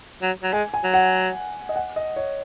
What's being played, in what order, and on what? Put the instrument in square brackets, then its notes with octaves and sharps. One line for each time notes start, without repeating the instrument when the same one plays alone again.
[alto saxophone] F#3
F#3
[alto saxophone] G#3 [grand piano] G#5
[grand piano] G#5
[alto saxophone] F#3
[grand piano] F#5
D#5
F#5
D#5
C#5